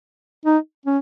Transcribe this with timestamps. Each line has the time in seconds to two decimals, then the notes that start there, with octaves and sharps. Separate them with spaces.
0.46 D#4
0.86 C#4